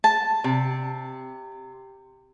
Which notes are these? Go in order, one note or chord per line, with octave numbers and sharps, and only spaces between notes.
A5
C3